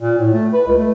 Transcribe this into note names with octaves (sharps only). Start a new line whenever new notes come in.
A#2
A2
A3
B4
C#2
A3